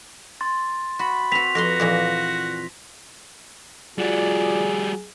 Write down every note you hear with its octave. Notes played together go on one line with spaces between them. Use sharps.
C6 A6
F#4 B5
C4 F#4 B6 F7
F2 F#4 B4 C6 A#6
F2 A#2 E3
G3 F4 F#4 G#4 D5